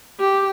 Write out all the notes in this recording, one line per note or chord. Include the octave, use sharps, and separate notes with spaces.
G4